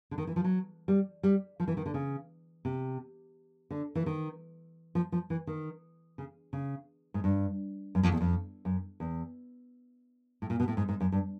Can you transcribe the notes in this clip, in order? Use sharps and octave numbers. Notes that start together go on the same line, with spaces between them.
D3
D#3
E3
F3
F#3
G3
G3
F3
E3
D#3
D3
C#3
C3
D3
E3
D#3
F3
F3
E3
D#3
C#3
C#3
G#2
G2
F#2
F2
E2
F2
F#2
E2
A2
A#2
B2
A2
G#2
G#2
F#2
G2